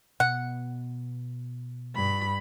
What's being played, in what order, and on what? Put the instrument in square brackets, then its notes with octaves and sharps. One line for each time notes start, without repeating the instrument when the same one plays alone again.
[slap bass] B2 B3 [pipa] F#5
[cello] G2 [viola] B5